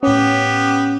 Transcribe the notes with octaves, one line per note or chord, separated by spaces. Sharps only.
A2 B3 C#4 G4